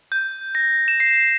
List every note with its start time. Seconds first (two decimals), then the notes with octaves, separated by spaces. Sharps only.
0.12 G6
0.55 A#6
0.88 E7
1.00 C7